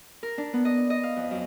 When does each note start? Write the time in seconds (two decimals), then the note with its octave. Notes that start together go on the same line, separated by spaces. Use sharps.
0.23 A#4
0.38 D4
0.53 B3
0.65 D#5
0.90 D#5
1.03 F5
1.17 F2
1.31 F#2